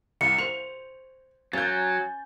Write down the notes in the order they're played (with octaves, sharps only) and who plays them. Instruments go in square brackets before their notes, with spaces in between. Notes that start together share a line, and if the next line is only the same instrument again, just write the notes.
[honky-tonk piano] C2 [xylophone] C#7
[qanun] C5 C#6 [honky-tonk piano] F7
[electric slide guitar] F#3 [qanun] C#4 [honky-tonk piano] G6 A6